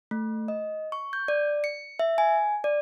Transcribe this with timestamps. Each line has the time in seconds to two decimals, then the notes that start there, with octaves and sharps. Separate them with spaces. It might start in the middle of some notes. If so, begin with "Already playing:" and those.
0.11 A3
0.48 D#5
0.92 C#6
1.13 G6
1.28 D5
1.64 C#7
1.99 E5
2.18 G#5
2.64 D5